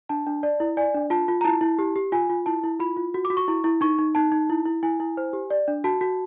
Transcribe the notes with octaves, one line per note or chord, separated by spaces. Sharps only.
D4 A5
D4
D5
E4
D5 G#5
D4
F4 A5
F4
A#5
E4 A5
E4
G4
G4
F4 G#5
F4
E4 A5
E4
F4 B5
F4
F#4
D6
F#4
C#6
E4
E4
D#4 C#6
D#4
D#4 A5
D#4
E4
E4
E4 G#5
E4
C5
G4
D5
D4
F#4 A5
F#4